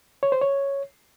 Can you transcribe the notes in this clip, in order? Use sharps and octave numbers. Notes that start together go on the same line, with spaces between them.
C#5
C5
C#5